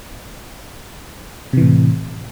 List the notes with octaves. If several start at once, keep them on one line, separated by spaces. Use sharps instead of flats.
A2 C3 E3